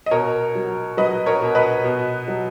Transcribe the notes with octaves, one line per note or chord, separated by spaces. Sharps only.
D#5
B2 A#4 C#5
F#3
F#3 B4 D#5
A#4 C#5
B2
B4 D#5
B2
F#3